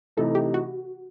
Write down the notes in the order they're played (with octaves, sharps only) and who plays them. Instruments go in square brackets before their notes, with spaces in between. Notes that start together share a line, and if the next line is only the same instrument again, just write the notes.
[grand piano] C3 E3 A3 D#4 [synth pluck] A4
[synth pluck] G4
F#4